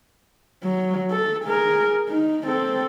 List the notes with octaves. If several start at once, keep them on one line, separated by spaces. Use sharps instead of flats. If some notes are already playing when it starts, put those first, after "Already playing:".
F#3
A4
G#4 A#4
D#4
C4 A4